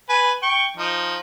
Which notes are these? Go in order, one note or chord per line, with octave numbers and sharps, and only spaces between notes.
B4 G#5
G5 C#6
F3 D#4